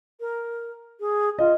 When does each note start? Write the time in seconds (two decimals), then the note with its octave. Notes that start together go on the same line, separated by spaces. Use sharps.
0.20 A#4
1.00 G#4
1.38 F4 D#5